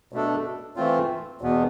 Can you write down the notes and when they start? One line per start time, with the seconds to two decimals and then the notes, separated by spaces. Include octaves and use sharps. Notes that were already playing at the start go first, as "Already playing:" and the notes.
0.13 B2 A3 D4 A4
0.76 E3 A3 C4 F4
1.41 E2 B2 B3